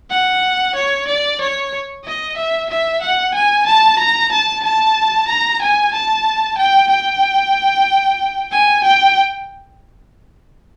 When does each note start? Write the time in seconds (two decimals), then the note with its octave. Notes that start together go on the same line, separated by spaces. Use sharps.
0.10 F#5
0.75 C#5
1.08 D5
1.41 C#5
2.05 D#5
2.37 E5
2.70 E5
3.02 F#5
3.34 G#5
3.67 A5
3.99 A#5
4.32 A5
4.63 A5
5.28 A#5
5.61 G#5
5.93 A5
6.58 G5
6.90 G5
8.51 G#5
8.84 G5